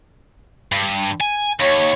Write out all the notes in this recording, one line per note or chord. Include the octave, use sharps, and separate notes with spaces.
G2
G#5
D#2 C#5